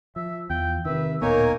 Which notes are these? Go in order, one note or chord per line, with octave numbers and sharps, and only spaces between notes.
F3 E5
E2 F4 G5
C3 D#3 B4 E5
D1 A#2 A#3 B3 D#4 A#4 C#5 G#5